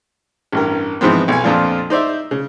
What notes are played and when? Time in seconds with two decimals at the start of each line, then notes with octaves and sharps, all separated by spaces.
0.52 A1 G2 A#4
1.01 G#2 E3 F3 B3 C4
1.28 B1 G#5
1.44 F2 A#2 F3 D4 F4
1.90 D#4 C5 D5 E5
2.31 C#3